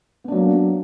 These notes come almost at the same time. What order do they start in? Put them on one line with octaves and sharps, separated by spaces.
B3 D4 F#3 A#3